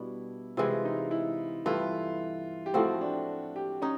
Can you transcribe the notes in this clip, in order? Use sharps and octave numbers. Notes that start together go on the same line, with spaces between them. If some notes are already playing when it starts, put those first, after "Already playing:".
Already playing: B2 G3 B3 D4 E4
C3 E3 G#3 F4
D#4
E4
G2 E3 A3 F4
G4
A2 F3 A3 C4 F#4
D4
G4
C#4 D#4